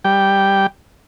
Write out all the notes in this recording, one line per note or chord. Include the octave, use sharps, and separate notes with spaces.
G3 G5